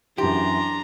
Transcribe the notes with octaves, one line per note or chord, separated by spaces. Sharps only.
F#2 E3 D4 G4 A#5 C6